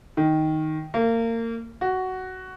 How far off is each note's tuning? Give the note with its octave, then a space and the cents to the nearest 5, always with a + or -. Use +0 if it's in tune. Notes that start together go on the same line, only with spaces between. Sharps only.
D#3 +5
A#3 -30
F#4 +10